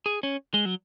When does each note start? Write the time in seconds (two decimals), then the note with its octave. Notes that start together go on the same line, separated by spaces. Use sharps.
0.06 G#4
0.23 C#4
0.54 G#3
0.66 F#3